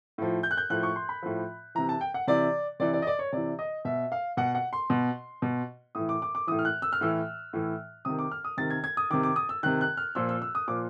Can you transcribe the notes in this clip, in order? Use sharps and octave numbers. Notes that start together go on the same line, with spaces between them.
A2 F3
G6
F#6
G6
A2 F3 F#6
C#6
C6
B5
A2 F3
C3 E3 A#5
A5
G5
F#5
C3 E3 D5
C3 E3 D5
D5
D#5
D5
C#5
C3 E3 D5
D#5
B2 E5
F5
B2 F#5
F#5
C6
B2
B2
A2 E3 D#6
D6
D6
D6
A2 E3 D#6
F6
F#6
E6
F6
A2 E3 E6
A2 E3
C3 D#3 D#6
D6
F6
D#6
C3 D#3 A6
G#6
G#6
D#6
C3 D#3 D6
D6
D#6
E6
C3 D#3 F#6
F#6
F6
A#2 F3 E6
E6
E6
D#6
A#2 F3 D6